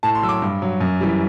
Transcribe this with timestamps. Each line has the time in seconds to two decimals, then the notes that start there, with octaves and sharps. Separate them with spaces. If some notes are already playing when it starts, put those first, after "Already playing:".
0.03 A2 A5
0.15 C6
0.22 F#3 E6
0.29 D6
0.42 G2
0.62 F#3
0.81 F#2
1.01 E3 G3